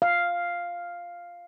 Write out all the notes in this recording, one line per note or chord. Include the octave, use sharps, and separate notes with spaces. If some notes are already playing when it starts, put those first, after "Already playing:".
F5